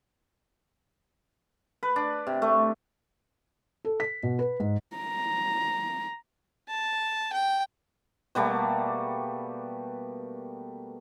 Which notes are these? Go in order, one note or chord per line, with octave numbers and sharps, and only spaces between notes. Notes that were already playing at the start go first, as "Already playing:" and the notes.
B4
D4
C3
A3
A4
B6
B2
B4
G#2
A#5
A5
G5
B2 G3 A3 A#3